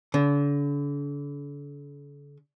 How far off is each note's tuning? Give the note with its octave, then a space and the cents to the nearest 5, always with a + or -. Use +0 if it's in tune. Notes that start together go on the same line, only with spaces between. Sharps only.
D3 -40